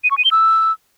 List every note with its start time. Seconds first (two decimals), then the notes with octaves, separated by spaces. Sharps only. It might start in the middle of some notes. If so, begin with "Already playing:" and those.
0.04 D#7
0.11 C#6
0.18 D#7
0.25 G7
0.32 E6